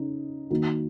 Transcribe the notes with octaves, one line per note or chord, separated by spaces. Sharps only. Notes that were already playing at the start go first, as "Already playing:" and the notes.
Already playing: C#3 D#4
D#3 A#3 D#4 F#4